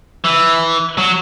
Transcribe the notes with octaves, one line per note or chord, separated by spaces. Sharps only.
E3
F#3